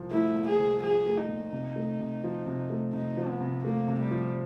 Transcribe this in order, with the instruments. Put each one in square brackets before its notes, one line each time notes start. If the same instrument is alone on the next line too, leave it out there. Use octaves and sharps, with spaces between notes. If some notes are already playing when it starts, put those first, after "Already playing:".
Already playing: [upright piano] C2 A#2 F3
[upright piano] A3 [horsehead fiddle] E4
[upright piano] A#2
[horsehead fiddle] G#4
[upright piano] C2
[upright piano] F3 [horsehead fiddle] G#4
[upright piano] A3
[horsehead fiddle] D#4
[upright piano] A#2
C3
A3
C3
F3
C3
A3
[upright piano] C3 [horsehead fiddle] D#4
[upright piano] F3
[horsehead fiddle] B3
[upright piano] C3
[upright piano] A3 [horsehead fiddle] A#3
[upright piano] C3
[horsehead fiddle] G3
[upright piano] F3